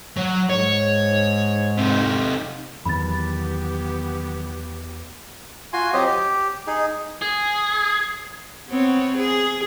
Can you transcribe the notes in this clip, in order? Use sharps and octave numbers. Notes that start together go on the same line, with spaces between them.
F#3
G#2 C#5
C3 D#4
E2 D#3 F#3 B3 G4 B5 A6
F4 F#4 G#5 C6
F#3 C4 G4 D#5
G4
D#4 G#4
G#4
B3 C4 C#5
G#4